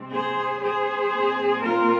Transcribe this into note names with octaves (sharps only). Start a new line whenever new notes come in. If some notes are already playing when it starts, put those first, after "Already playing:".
Already playing: C3 G#3 C4
G#4 C5
G#4 C5
A#2 G#3 C4
F4 A#4